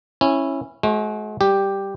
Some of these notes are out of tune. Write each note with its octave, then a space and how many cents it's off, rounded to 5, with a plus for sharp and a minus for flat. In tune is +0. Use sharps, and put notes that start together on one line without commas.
C#4 -15 E4 +0
G#3 +45 F#4 +0 C5 +35
G3 +0 G4 +0